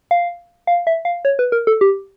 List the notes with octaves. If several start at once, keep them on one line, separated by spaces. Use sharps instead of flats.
F5
F5
E5
F5
C#5
B4
A#4
A4
G4